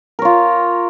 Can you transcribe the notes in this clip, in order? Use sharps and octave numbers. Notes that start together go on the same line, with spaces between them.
F4 A#4 C#5